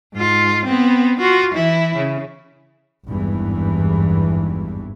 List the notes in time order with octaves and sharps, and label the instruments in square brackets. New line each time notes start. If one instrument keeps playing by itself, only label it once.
[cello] G#2 F4
B3 C4
F4 F#4
E3 E4
C#3
[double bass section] G#1 E2 G2 E3